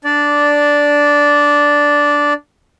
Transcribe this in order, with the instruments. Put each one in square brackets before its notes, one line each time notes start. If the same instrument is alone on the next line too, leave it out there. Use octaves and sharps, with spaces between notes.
[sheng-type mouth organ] D4 D5